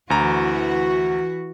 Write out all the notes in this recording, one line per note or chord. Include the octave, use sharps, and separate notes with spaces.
D2 E3 F#4 A#5